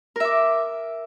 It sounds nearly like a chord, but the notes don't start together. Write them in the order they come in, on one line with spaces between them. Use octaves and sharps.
A#4 E5 D6